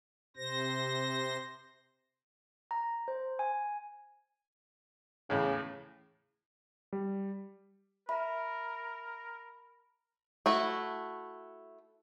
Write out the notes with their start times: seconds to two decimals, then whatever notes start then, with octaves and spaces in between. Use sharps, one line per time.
0.37 C3 C5 A#6
2.71 A#5
3.08 C5
3.39 G#5
5.30 E2 A2 C#3
6.93 G3
8.09 A#4 E5 A#5 B5
10.46 A3 E4 F#4